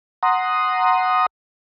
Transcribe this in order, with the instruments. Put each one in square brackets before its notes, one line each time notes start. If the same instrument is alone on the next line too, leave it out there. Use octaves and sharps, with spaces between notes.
[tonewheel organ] F#5 A#5 C6 D#6